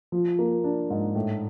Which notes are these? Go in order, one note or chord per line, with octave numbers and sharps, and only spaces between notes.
F3
A#3
D4
G#2
A2